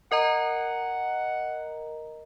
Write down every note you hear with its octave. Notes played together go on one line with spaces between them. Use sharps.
A#4 D#5 F#5 A#5